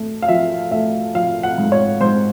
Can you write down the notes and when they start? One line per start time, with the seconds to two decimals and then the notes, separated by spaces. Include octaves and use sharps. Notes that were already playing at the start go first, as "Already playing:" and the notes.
Already playing: A3
0.22 F5
0.28 F3 E5
0.71 A3 E5
1.15 F3 F5
1.43 F#5
1.58 G#2
1.72 C#5
2.01 G#2 C5